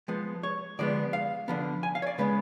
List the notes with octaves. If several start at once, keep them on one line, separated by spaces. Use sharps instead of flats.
F3 G#3 B3
C#5
D3 F3 G#3 B3 D5
F5
D3 F3 B3
G#5
F5
C#5
D5
C#3 G#3 B3 B4